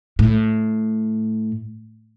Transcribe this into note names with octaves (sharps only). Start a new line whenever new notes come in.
A2